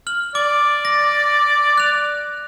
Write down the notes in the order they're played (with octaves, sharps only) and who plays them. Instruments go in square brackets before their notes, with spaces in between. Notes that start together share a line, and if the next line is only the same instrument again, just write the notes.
[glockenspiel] F6 F#7
[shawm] D5 [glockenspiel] D6
[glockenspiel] A#6
F#6 F7